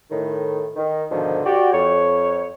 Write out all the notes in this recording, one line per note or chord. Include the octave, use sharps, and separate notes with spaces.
A2 D#3
D#3
G#2 B2 D3 D#3 F3
F#4 G4 D5
F2 C#5